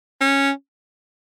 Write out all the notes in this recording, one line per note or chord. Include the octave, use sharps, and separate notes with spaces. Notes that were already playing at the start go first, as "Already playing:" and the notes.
C#4